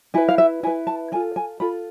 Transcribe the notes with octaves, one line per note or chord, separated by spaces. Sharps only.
E4 B4 G#5
F5
E5
E4 B4 G#5
A5
F4 A4 G#5
G#5
F4 A4 B5